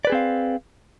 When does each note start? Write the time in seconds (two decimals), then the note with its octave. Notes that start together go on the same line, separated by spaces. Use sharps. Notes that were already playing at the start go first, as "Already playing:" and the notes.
0.05 D5
0.07 B4
0.10 G#4
0.12 C4
0.15 F5